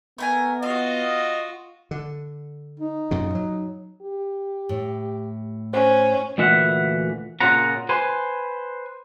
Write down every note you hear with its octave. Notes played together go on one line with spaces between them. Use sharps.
A3 B3 A#4 G#5
F4 F#4 D#5 F5
D3
D#4
F#2 A#2 C#3
F#3
G4
A2
C#4 C5
D2 A#2 E3 E5 F#5
A#2 C#3 A#3 F4 F#5 A#5
B4 C5 G#5